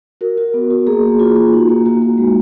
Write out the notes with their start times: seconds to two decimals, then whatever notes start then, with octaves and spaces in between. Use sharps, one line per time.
0.21 F#4 A#4
0.37 F#4
0.54 B3
0.70 F#4
0.87 A#3 G#4
1.03 A#3
1.19 F4 F#4
1.36 A#3
1.53 D#4
1.69 A#3
1.85 A#3 F#4
2.02 A#3
2.18 G#3